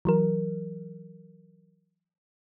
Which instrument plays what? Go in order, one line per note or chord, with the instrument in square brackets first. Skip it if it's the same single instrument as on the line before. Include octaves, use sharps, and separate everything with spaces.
[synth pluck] E3 F#3 A#4